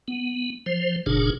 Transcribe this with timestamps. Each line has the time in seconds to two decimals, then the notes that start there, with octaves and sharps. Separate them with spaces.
0.08 B3
0.66 F3 C5
1.06 F#1 A#2 C#3 D4 G#4